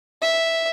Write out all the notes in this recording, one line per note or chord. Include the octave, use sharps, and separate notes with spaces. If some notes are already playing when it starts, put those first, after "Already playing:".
E5